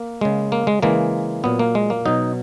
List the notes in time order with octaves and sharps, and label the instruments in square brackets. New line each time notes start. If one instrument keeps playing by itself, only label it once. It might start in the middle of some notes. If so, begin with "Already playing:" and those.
Already playing: [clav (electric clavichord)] A#3
C#3 G#3
A#3
G#3
C#3 E3 G#3 A#3
A#2 F#3 B3
A#3
G#3
A#3
B2 F#3 D#4